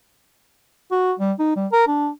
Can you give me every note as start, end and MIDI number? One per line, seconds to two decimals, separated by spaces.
0.91 1.13 66
1.19 1.32 55
1.39 1.56 63
1.56 1.67 55
1.72 1.87 70
1.88 2.09 62